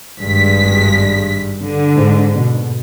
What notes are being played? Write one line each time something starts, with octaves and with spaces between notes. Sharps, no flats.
G#1 G2 G#3 B6
D3
G#2
B2